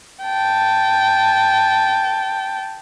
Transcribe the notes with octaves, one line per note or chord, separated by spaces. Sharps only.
G5 A5